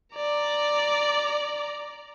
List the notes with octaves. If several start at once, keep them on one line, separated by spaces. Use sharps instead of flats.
D5 A#5